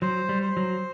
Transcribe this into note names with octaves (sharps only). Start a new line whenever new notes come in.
F#3 C5
G3
C5
F#3